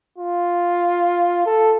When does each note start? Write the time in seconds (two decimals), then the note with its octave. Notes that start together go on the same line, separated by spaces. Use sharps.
0.18 F4
1.46 A4